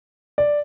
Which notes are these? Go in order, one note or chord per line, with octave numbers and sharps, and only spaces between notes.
D5